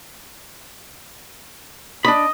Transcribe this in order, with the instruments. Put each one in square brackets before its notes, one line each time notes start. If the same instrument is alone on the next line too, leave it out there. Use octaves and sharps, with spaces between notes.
[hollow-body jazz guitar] D4 B5 [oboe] D#5